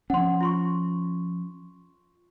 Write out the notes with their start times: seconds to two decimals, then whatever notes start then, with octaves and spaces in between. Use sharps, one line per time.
0.10 F3 C#4 F#5 C6
0.41 F4 C6 C#6